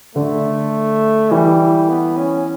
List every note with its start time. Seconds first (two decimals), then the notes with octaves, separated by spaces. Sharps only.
0.15 D3 A3
1.31 E3 G3
1.89 B3
2.17 C#4